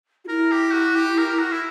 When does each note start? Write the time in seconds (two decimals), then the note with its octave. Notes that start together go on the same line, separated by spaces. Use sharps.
0.25 F#4
0.28 E4 A#4
0.52 G4
0.73 F#4
0.95 G4
1.18 A#4
1.29 A#4
1.39 F#4
1.51 E4